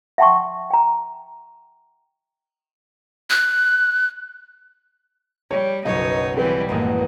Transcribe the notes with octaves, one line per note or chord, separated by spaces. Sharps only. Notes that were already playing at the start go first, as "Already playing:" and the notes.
E5 F#5 G5 A5 C6 C#6
G5 A#5
F#6
G3 C#5
F#1 B1 F#2 D#4 C#5 D#5
E3 G3 C4 B4
A1 F#2 D#3 G#3 A#3